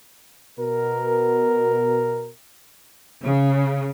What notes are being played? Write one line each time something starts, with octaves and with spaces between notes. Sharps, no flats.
B2 A#4
C#3